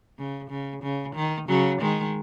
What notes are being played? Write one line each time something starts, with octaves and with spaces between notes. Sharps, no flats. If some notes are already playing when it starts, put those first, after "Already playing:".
C#3
C#3
C#3
D#3
C#3 F#3
D#3 G#3